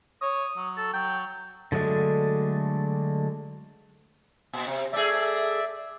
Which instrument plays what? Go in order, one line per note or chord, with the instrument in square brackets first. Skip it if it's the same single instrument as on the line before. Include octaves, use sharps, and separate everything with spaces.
[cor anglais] C#5 [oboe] D#6
[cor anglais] F#3
[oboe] A4
[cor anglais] F#3 [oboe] G5
[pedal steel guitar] D3 F#3 G#3 A3 D4
[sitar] A#2
C3
[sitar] A3 G#4 [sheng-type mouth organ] D5 E5